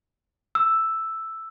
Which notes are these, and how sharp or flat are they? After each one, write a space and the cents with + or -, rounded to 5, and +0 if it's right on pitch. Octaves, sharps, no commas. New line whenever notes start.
E6 +0